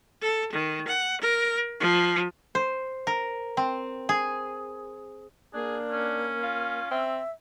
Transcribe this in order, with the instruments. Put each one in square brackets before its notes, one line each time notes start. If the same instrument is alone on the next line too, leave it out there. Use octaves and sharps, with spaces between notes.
[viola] A4
D#3
F#5
A#4
F3
[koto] C5
A#4
C4
G#4
[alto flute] A#3 [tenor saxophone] D4 [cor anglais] G#4
[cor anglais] C#4
[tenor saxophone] F4
[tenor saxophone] C4 [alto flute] E5